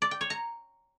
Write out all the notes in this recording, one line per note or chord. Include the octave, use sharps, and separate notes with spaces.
D5
G5
C#5
A#5